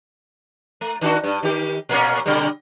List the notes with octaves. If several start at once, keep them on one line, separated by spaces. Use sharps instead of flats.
A3
D#3 D4 F#4
G2
D#3 G4
A#2 A#3 C#4
B2 D3 G3